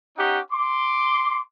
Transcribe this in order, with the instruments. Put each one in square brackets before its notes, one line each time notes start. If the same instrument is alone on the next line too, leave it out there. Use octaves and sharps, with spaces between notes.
[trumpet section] C#4 D#4 G4 F#5
C6 D6